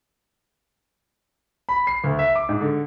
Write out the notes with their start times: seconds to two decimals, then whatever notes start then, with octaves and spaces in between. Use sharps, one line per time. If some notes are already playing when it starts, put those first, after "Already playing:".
1.69 B5
1.87 C7
2.04 D2
2.19 E5
2.35 D6
2.49 G#2
2.61 D3